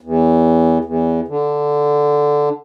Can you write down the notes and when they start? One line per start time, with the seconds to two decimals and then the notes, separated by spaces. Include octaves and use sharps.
0.01 E2
0.85 E2
1.28 D3